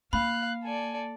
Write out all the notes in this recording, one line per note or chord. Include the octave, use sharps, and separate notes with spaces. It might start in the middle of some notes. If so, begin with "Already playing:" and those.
A#3 F5 B5 F#6
A4 D5 G#5